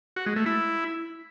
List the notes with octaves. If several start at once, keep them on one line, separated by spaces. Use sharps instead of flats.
F#4
G#3
A3
E4